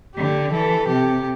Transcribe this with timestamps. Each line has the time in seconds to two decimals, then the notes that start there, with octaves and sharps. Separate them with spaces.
0.15 D3 G4
0.52 E3 A4
0.88 C3 G4